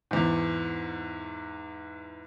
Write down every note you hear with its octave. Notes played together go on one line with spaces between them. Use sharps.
E2 G#2